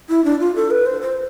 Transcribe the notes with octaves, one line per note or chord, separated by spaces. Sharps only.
E4
D4
F4
A4
B4
C5
C5